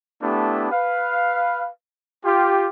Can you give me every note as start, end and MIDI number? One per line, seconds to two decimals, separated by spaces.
0.21 0.68 57
0.21 0.68 59
0.21 0.68 62
0.21 0.68 64
0.21 0.68 67
0.71 1.68 71
0.71 1.68 77
2.24 2.67 65
2.24 2.67 67